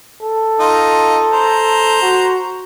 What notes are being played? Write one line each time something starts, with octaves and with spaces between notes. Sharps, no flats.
A4
D#4 F4
C5 A#5
F#4